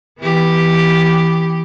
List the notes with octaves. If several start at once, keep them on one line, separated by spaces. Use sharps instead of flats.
E3 B3 G4